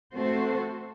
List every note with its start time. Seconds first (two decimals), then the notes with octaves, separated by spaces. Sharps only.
0.14 A3 C4 F#4 A4 C5